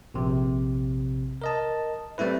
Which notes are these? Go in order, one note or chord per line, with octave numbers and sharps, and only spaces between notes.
A#1 C3
A#4 D#5 A5
G3 A3 C4 E4 B4